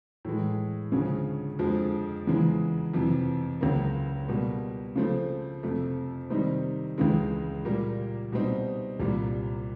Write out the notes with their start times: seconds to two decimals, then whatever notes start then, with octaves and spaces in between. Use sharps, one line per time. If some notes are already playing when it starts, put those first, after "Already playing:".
0.25 A2 E3 G#3
0.92 D2 C#3 F3 G#3 C#4
1.59 F2 D3 F3 G#3
2.27 E2 C#3 E3 G#3
2.94 F2 C3 E3
3.61 C#2 C#3 F#3 A#3
4.28 B2 G3 A#3
4.96 C#3 F3 A3 C4
5.63 F2 C3 F3 A3
6.30 C3 D#3 G3 C4 D#4
6.98 C#2 C#3 E3 G#3
7.65 A#2 G3 A#3
8.32 B2 G3 C4 D#4
9.00 C2 A#2 G3